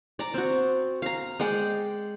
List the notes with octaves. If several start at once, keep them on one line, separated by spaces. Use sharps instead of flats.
D5 A#5
C4 F#4
F5 A#5
G#3 D5 F#5 G5